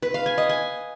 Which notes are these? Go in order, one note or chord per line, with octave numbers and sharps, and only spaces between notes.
B4
F5
G#5
D#5
G#5